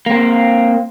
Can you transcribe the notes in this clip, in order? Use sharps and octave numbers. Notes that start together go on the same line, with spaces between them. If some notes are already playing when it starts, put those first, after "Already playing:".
A#3 C4